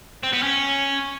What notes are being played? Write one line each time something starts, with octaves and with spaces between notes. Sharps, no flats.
C4
B3
C#4